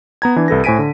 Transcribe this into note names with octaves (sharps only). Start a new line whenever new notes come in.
B3 A#5 G#6
E3 D4
C2 A4 B4 A#6
A2 C5 G#5 B6 D7 D#7
D3